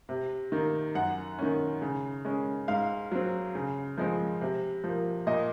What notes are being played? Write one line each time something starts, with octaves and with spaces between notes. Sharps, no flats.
C3
D#3 A#3
F#2 F#5
D#3 A#3 C#4
C#3
G#3 C#4
G#2 F5
F#3 C4
C#3
F3 G#3 C4
C3
F3 A#3
A#2 D#5